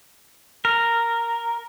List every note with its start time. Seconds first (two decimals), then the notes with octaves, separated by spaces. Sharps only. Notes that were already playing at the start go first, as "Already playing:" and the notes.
0.65 A#4